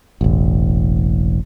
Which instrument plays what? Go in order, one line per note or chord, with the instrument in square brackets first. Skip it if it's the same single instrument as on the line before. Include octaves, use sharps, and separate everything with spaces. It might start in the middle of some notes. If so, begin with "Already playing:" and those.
[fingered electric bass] E1 A1